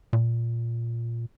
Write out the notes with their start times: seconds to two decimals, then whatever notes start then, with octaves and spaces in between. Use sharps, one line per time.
0.13 A#2